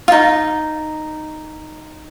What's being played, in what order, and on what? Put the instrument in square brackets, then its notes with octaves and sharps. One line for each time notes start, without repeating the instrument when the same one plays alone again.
[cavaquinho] D#4 F4